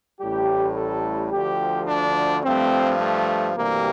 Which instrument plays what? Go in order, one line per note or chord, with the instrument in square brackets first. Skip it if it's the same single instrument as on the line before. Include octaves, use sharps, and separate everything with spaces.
[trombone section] A1 A2 G3 G4
A4
D2 D3 F3 G4
D4
G2 F3 A3 C4
A3
D2 C3 E3 G3 A#3